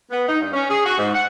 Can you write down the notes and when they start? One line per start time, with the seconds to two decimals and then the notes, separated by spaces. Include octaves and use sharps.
0.11 B3
0.29 D#4
0.41 G2
0.53 C#4
0.70 G#4
0.86 F#4
0.98 G#2
1.15 F#5